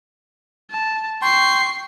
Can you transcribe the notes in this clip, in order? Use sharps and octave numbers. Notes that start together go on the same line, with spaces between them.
A5
G5 C6 C#6 C7